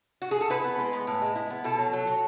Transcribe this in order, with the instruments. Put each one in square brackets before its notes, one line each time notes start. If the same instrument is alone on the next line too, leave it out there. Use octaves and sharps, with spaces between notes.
[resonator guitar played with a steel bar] F#4
G#4
A4
E4 B4
B3
G#3
B3
A2
G#3
E4
B3
B2 A4
F#3
F#3
F#3